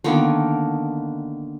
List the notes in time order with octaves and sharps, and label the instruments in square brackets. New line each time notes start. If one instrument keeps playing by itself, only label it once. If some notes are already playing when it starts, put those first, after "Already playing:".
[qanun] D3 D#3 A#3 B3